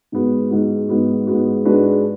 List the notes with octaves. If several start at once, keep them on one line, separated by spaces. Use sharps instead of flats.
G#2 G#3 B3 F#4
G#2 G#3 B3 F#4
G#2 G#3 B3 F#4
G#2 G#3 B3 F#4
G#2 G#3 D4 F#4 B4